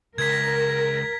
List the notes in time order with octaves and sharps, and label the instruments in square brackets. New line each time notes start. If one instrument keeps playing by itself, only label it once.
[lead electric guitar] C#2 [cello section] A#4 [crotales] G#6 B6